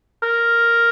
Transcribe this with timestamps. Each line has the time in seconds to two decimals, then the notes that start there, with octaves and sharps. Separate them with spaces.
0.23 A#4